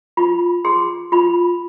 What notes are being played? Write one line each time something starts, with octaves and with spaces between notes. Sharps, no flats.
F4 B5
G#4 C6
F4 B5